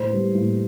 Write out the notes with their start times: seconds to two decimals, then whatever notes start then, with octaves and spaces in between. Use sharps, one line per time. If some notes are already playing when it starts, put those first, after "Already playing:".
Already playing: A2 C5
0.10 G3 B3
0.35 A2